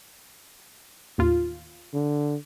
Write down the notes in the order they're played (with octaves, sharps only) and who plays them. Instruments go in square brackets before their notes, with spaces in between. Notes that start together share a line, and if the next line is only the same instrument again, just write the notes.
[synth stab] A1 D#2 F4
[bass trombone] D3